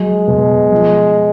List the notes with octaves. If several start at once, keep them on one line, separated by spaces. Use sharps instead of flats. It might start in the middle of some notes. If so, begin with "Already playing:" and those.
Already playing: F#3 G#3
B2
F3